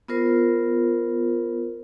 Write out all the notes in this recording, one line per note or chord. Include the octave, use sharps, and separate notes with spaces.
B3 F4 A#4 C5